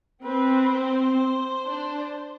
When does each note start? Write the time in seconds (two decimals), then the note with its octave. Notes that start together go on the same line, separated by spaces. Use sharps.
0.23 C4 B4
0.71 C5
1.66 D4